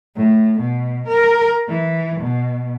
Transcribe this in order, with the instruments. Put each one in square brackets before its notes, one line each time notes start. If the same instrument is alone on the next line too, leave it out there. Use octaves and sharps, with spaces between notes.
[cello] A2
B2
A#4
E3
B2